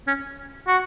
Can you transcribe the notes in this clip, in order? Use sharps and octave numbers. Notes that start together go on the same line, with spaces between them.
C#4
F#4